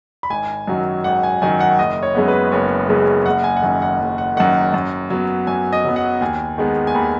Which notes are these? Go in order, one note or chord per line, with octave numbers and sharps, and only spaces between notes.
B5
G#1 G#5
F#2 D#3 F#3
G#1 F#5
G#5
F#2 D#3 F#3 G#5
F#5
F#1 D#5
C#5
F#2 C#3 G#3 B3
B4
F#1 C#5
F#2 C#3 G#3 B3
F#1 F#5
G#5
F#5
F#2 D#3 G#5
F#5
F#1
F#5
F#2 D#3 F#5
F#2
F#3 B3
F#2 G#5
D#5
F#3 B3
F#5
D#2 G#5
D#3 G#3 B3
G#5
D#2 B5